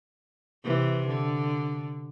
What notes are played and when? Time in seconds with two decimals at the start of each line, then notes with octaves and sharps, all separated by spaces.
0.64 C3 E3
1.07 D3